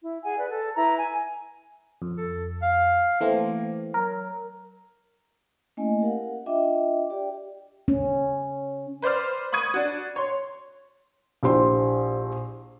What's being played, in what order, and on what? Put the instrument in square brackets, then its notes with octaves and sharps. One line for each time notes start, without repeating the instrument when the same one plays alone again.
[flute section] E4
G#4 F#5 G#5
B4 D5
A4
E4 B4 A#5
G#5
[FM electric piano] F2
[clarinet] A4
F5
[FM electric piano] E3 A3 C4 [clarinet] A#3
[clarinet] F#3 [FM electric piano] A#4
[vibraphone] A3 A#3 C#4 E4 D#5 G#5
G4 A#4 F5 F#5
D4 F4 D#5 E5 G5 D6
G4 D5 G5
[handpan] C#4
[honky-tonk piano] B4 C5 D5 D6 F6
B5 C#6 D#6 G#6 D#7
D4 F#4
C#5 C6
[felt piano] A#1 E4 G4 C5 C6